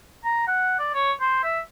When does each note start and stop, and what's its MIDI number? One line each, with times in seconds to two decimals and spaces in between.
0.24 0.44 82
0.47 0.78 78
0.79 0.91 74
0.94 1.12 73
1.21 1.38 72
1.43 1.59 76